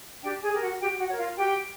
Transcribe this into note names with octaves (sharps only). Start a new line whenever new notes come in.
D4 G4 G5
G#4 G#5
G4 A#4
F#4 F#5
F#4 G4 G5
F#4 F#5
A#4 C#5
F4 F5
F#4 G4 G5